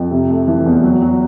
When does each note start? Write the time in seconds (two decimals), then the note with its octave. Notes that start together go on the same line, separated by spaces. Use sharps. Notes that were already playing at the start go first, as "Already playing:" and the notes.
Already playing: F2
0.11 C3
0.29 A3
0.47 E3
0.66 E2
0.83 F#3
1.02 F#3